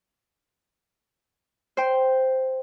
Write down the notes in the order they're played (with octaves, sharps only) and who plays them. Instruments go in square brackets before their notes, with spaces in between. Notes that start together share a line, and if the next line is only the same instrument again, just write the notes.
[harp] C5 G5